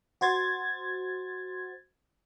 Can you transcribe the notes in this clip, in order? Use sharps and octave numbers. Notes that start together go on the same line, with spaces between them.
F#4 C5 G#6 A6